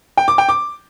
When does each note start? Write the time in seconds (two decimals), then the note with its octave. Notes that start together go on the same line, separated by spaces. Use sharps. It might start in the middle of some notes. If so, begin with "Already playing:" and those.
0.17 G5
0.28 D6
0.38 G5
0.49 D6